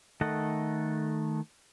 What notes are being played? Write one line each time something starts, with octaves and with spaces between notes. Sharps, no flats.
D#3 A3 A4 D#5 F#5